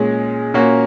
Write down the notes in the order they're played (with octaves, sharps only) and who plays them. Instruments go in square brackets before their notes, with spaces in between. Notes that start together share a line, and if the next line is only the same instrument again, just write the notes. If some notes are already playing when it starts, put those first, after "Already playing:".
Already playing: [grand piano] A#2 G#3 C#4
A#2 A#3 C#4 F#4